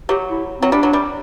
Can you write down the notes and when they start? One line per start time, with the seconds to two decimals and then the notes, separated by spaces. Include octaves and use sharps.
0.09 F#3 G4
0.30 E4
0.60 F#3 C4
0.72 G3 D4
0.83 F#3
0.93 G3